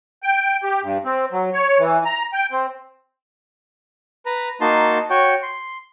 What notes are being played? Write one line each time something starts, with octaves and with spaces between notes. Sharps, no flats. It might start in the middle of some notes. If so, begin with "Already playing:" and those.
G5
G4
G2
C4
F#3
C#5
E3
A#5
G5
C4
B4 A#5
A#3 D#4 F#4 A5 C6
F#4 C#5 G5
C6